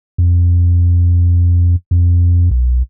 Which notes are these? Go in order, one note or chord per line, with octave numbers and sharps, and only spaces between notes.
F2
F2
B1